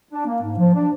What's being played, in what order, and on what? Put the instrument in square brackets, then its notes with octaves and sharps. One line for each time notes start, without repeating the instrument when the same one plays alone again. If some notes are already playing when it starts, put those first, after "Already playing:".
[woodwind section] D4
A#3
G#2
F3
D4